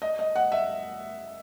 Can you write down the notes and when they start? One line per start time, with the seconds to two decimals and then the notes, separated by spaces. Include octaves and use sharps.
0.02 D#5
0.19 D#5
0.35 F#5
0.52 E5